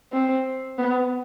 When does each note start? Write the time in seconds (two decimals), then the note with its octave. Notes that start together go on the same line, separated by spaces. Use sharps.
0.13 C4
0.78 B3